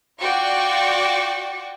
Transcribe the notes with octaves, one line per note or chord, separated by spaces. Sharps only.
F4 F#4 D5 G5 C#6